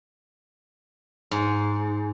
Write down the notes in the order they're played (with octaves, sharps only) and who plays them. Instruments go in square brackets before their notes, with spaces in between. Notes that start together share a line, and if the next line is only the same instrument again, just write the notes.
[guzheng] G#2